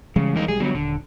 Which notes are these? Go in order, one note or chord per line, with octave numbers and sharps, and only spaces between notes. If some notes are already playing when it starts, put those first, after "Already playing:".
C#3 E3 G3 G#3
E2 A#3 D#4
B1 G3 G#3 G#4
D3 F#3 G3 B3
D#1 D3